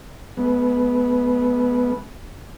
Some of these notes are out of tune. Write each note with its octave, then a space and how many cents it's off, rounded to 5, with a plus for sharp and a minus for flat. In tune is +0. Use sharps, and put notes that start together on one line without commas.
G#3 +45 B3 +0